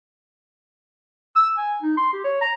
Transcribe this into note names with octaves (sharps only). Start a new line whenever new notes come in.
E6
G#5
D#4
C6
G4
C#5
A#5